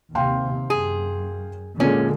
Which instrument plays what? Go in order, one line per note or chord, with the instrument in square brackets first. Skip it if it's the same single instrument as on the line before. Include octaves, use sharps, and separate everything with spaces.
[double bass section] D#2 C3 [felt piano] F5 G5 C6
[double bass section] F#2 [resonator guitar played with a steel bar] G#4
[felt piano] A#2 G#3 [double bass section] D3 [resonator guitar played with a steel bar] C#4